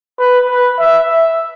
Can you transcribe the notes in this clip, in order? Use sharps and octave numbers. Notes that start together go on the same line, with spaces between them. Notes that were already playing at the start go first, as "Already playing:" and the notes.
B4
B4
E5
E5